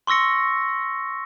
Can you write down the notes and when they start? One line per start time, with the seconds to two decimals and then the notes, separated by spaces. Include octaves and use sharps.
0.07 C6 C#6 E6 A#6 C#7